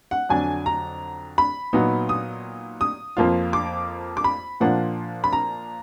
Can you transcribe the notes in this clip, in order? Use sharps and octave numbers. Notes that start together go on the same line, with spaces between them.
F#5
F2 D3 F#3 D4 G#5
A#5
B5
A#2 F#3 B3 D#4
D#6
D#6
F2 F3 A#3 F4
D6
D6
B5
A#2 F3 A#3 D4 F4 F#5
B5
A#5